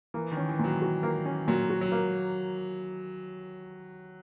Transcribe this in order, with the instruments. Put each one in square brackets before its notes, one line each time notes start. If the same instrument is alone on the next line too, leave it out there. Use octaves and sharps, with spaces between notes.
[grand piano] E3 [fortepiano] A#3
[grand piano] D#3
[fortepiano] C#4
[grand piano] E3
[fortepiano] A#2 [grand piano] F#3
[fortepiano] F#4
A#3
C#4
[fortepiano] A#2 [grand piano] F#3
[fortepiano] F#4
[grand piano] F#3
[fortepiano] A#3